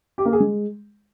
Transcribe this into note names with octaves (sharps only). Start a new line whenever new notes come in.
G4
A#3
G#4
G#3